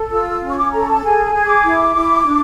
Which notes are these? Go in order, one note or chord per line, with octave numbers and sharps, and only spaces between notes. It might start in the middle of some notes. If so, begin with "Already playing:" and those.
Already playing: A4
F4 E6
C#4
C#6
D6
A4 A#5
A5
G#4 G#5
G#5
G#4
D6
E4
E4
D4